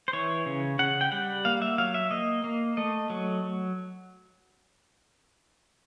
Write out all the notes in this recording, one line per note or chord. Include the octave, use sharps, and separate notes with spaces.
C5
E3 C#5
C#3
C#3 F#5
G5
G3 F#5
A#3 F5
E5
F#3 F5
E5
A#3 D#5
A#3
A3 D#5
F#3